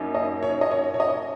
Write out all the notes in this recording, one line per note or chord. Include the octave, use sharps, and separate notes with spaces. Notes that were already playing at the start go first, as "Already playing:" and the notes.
Already playing: F#2 A#3 D#4
D#5
C#5
D#5
C#5
C#5
D#5